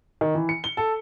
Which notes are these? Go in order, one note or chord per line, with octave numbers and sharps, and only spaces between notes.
D#3
E3
C#7
G7
A4